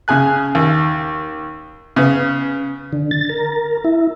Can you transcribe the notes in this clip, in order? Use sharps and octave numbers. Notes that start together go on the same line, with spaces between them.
C#3 G#4 G#5 F#6
D#2
C#3 B3
D3
A6
A#4
E4